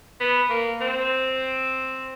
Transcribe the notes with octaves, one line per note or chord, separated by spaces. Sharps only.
B3
A#3
C4